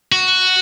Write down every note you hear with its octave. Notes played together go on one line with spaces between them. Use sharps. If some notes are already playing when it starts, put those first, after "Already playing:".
F#4